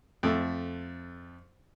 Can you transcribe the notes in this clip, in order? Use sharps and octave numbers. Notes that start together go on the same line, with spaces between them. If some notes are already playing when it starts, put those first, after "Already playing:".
F2 A3